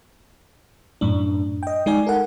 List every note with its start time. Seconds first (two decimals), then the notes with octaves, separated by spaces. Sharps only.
1.01 F#2 A2 D4
1.63 D#5 G5
1.86 G#3 D#4 D5 G#5
2.07 A4 A#4 F#5